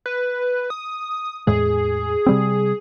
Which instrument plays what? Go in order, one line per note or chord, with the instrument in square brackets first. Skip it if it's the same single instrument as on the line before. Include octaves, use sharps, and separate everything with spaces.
[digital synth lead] B4
D#6
[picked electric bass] E2 A2 G#3 [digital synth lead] G#4
[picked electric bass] C3 G3 C4